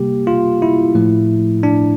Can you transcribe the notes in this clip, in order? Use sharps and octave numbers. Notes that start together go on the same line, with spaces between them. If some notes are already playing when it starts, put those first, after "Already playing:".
Already playing: C3 G3 A#3 G4
F4
E4
A2 F3 A3
D4